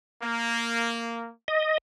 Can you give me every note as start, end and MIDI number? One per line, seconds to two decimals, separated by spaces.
0.22 1.29 58
1.48 1.78 75